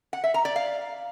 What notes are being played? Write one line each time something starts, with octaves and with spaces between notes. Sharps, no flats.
F#5
E5
A#5
D5
F5